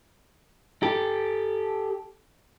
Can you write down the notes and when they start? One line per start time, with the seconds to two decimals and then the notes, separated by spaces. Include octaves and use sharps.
0.83 G4 A4